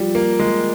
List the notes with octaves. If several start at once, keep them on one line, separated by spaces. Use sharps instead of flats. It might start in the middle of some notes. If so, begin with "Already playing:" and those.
Already playing: F3 G3
A#3
G#3